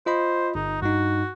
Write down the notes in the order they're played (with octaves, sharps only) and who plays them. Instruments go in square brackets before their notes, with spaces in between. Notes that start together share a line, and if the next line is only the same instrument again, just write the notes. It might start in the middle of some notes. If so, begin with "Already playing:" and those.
[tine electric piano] F4 D#5 B5 [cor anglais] C5
[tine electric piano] G1 [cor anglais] D#4
[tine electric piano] G2 D#4 [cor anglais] F#4